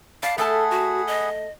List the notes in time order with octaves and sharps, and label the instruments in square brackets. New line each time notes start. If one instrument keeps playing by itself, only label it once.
[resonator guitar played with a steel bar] D5 [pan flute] F5 [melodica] A5 B5
[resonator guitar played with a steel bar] A3 A5 [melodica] G#4 F#5 B5 [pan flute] A4
[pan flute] F#4
D#5